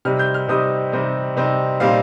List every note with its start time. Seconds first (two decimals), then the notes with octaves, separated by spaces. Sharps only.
0.05 C3 G3 C4 D#4 F6
0.19 G6
0.34 F6
0.48 C3 G3 C4 D#4 D#6
0.92 C3 G3 C4 D#4
1.36 C3 G3 C4 D#4
1.80 A#2 G3 C4 D#4 F5